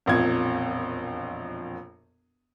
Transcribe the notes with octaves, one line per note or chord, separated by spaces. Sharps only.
E1 A#1 F2 G#6